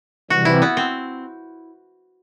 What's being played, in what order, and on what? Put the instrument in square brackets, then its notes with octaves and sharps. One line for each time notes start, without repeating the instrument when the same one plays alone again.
[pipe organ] C3 E3 G3 [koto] F#4
[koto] E4
B3
C4